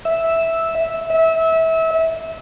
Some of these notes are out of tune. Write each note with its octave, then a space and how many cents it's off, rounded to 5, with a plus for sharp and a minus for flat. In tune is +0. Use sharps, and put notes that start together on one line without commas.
E5 -5
E5 -25